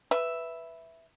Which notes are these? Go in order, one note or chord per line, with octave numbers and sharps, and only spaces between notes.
B4 E5